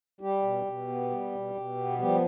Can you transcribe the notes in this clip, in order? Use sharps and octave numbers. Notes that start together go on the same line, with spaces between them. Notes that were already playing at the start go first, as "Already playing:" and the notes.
G3 G4
B2
B2
B3
G3
B2
B2
B3
F3 G3 G4